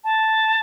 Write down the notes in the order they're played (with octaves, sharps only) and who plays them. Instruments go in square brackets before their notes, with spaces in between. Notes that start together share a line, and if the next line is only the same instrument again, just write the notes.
[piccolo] A5